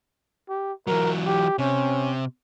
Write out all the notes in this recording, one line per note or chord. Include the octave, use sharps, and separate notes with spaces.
G4
E3 F#3 A#4
G4
C3 C#4